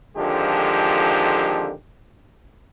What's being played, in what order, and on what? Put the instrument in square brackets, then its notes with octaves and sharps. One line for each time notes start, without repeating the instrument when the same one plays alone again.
[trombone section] F2 D3 D#3 F3 G#3 G4